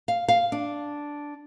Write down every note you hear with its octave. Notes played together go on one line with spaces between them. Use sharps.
F5
F5
D4